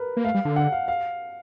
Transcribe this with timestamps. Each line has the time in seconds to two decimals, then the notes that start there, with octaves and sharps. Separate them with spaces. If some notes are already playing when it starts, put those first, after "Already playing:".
Already playing: A#4 B4
0.17 A#3
0.25 A3 F5
0.34 G3
0.45 D3
0.56 F#5
0.72 F5
0.88 F5